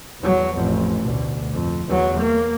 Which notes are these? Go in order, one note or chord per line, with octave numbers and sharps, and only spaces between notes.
E2 F#3
A1 F2
D2 B2
F2
E2 F#3
A#3